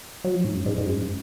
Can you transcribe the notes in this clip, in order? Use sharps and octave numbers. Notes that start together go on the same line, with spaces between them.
F#3
F3
G#2
F#2
G#2
G#2
F#2
G#2